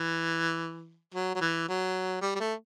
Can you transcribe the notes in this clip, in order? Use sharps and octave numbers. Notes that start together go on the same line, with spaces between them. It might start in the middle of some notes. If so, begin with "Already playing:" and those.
Already playing: E3
F#3
F#3
E3
F#3
G3
G3
A3